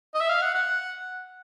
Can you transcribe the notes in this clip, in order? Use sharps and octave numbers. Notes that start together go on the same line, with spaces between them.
D#5
E5
F5
F#5
F#5